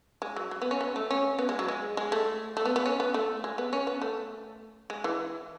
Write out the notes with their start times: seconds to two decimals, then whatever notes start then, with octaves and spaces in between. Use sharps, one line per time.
0.22 G#3
0.36 F#3
0.51 F#3
0.62 B3
0.71 C#4
0.81 B3
0.96 A3
1.11 C#4
1.39 B3
1.49 G#3
1.59 F#3
1.68 G#3
1.97 G#3
2.12 A3
2.57 A3
2.66 B3
2.76 B3
2.86 C#4
3.00 B3
3.14 A3
3.44 G#3
3.58 B3
3.73 C#4
3.87 B3
4.02 A3
4.90 G#3
5.04 E3